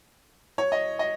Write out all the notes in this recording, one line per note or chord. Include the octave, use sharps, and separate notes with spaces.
C#5
D#5
D#5